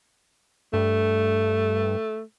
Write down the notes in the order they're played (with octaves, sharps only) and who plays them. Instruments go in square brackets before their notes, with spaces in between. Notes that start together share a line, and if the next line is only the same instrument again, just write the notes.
[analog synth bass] G2 [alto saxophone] A3